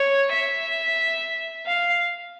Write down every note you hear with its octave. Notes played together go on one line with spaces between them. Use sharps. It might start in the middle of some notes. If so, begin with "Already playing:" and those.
Already playing: C#5
E5
F5